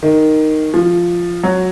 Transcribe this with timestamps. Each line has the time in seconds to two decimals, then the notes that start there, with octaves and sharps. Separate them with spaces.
0.03 D#3
0.74 F3
1.43 F#3